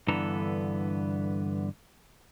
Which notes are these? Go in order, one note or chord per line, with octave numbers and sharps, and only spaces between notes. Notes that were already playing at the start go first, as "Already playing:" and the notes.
G2 D3 E3 B3 A4 A#5